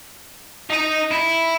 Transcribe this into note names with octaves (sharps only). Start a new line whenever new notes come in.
D#4 D#5
E4